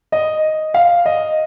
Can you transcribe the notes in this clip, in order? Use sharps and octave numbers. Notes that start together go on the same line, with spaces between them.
D#5
F5
D#5